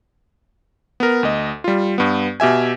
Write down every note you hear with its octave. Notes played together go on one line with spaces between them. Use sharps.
B3 A#4
D2 D#5
G3 F4
G2 B3
B2 G4 E5 G#5